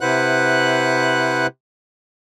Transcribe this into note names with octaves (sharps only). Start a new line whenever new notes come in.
C3 E4 B4 C5 F#5 F#6